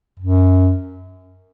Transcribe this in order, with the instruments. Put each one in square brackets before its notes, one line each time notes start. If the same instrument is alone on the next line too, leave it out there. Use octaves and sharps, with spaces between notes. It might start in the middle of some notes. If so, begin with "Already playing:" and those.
[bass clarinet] F#2